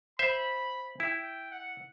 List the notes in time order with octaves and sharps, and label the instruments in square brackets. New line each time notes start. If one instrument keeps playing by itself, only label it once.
[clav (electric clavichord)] C5 E5 [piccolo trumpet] B5
[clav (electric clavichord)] E4 [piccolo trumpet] G5
[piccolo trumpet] F#5